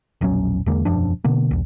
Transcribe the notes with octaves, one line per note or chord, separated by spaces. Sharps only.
E1 A#1 F#3 C#4
E2 D3 G#3 A#3
E1 F#2 F3 D4
B2 D3 A#3
B1 E2